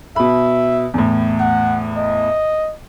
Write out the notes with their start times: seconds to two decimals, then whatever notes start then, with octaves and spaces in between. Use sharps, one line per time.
0.16 B2 E5 B5
0.94 E2 A2
1.40 F#5
1.97 D#5